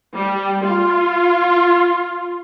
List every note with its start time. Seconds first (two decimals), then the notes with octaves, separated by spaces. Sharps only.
0.14 G3
0.65 F4